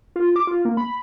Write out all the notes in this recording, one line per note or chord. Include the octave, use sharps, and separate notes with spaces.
F4
D6
F4
A#3
B5